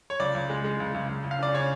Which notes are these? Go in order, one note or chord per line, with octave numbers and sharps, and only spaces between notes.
C#5
C#2 D5
C#2
G#3
G#3
C#2
C#2
C#2
C#2
F5
C#3 D5
C#3 C#5